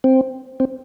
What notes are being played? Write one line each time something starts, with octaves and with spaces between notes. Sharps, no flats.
C4
C4